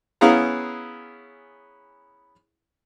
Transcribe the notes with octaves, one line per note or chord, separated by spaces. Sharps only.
B3 C#4 E4 G#4 F5 A#5